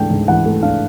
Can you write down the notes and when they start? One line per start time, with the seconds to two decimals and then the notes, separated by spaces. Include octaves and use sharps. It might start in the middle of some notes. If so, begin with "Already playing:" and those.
Already playing: G#2 E3 A3 D4 G5
0.11 G#2
0.28 E3 F#5
0.46 A3
0.63 D4 F5